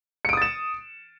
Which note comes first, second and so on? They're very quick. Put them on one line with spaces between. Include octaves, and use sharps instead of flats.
C#7 D7 D#6 A6 E7